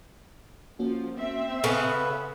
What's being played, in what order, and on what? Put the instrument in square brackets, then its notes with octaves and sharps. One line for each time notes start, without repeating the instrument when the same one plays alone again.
[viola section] F3 [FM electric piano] A#3 C#4 F#4
[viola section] C4 E5
[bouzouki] C#3 B3 [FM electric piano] A4